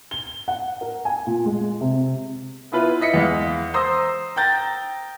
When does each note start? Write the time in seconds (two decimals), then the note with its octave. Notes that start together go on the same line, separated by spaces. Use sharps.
0.11 G7
0.48 F#5
0.81 A#4
1.05 G#5
1.27 A#2
1.46 G#3
1.81 C3
2.72 B3 E4 F4 B4
3.00 E4 D#5 B6 C#7
3.14 E2 G#3 F5
3.74 C5 A#5 C6 D#6 E6 A#6
4.36 G5 A#5 G6 A6 A#6